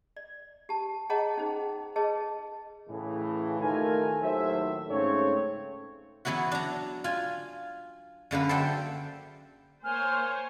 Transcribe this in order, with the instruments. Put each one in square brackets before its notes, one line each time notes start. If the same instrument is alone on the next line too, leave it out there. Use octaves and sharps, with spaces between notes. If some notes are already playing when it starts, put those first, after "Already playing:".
[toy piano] D5
G4 A5
G#4 C#5 D#5 F#5 A5 A#5
C#4 D#4 G#4 C5
G#4 B4 C#5 D#5 A5
[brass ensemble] A2 C#3 E3
D#2 D#3 A3 F4 A#4 G#5
D#2 A2 F#3 C5 E5
G#2 C#3 A3 C4 C#5
[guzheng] E3 F#3 B3 E4 F#4
D4 A#5
F4 G#5
F#2 D3 A#3 B4
A4 C5 D5 E5 G5
[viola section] A#3 C5 C#5 [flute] G#5 [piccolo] F6